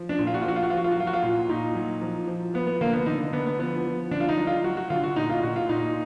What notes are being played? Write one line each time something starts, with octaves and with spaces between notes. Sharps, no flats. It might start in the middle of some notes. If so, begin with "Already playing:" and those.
Already playing: F3
D4
A#2
F4
F#4
F4
F3 F#4
F4
F#4
F3 F4
F#4
F4
F#4
F#3 F4
F#4
F4
A#2
A#2 D#4
F#3
F3
F3
F3 B3
B3
D3 A#3
B3
D3 D#4
D3 B3
B3
F3 B3
F3
D3 D4
F4
D#4
F#3
F4
F#3 F#4
F#4
D3 F4
F#4
A#2 D#4
F4
A#2 F#4
F4
A#2 D#4